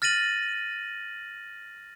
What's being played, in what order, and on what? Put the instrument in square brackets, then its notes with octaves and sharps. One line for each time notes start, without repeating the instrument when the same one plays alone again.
[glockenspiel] F6 A6 A#6 D#7 F#7